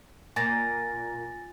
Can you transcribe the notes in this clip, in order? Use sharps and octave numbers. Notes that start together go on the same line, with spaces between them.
A#2 G#5 A6 A#6